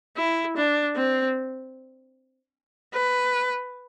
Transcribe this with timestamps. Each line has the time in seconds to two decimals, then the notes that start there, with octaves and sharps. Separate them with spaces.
0.17 E4
0.57 D4
0.96 C4
2.94 B4